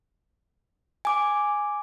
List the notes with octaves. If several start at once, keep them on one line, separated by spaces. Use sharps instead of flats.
G#5 D6